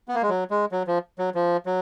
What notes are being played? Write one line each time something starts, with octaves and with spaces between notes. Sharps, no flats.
B3
A#3
G#3
F#3
G#3
F#3
F3
F#3
F3
F#3